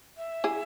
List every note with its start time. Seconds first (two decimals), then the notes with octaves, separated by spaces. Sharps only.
0.17 E5
0.44 E4 G#4